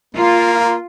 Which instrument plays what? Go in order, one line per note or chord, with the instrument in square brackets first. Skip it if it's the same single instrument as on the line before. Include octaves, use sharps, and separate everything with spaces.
[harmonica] A#3 [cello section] F4